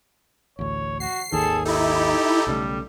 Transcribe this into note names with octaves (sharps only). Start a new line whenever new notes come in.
A1 D2 C#5
F#4 C7
G#1 D#2 D#3 G#4 A4
D#4 E4 G4 A4
B1 C#3 G3 A3